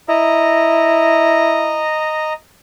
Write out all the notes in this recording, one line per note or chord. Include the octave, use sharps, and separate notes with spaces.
E4 D#5 A#5